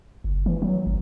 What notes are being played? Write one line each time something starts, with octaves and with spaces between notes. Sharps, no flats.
F#1
E3
F#3
G1